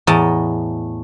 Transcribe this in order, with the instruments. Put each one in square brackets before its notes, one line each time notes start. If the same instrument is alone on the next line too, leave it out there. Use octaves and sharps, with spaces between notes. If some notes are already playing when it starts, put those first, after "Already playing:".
[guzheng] E2 A2 D#5 A5 A#5